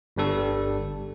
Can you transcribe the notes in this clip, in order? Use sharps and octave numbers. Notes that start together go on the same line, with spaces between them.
G1 G2 G3 A4